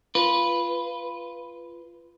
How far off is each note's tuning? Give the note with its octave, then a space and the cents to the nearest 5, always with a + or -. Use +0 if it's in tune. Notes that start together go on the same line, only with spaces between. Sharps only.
F4 -15 B4 -5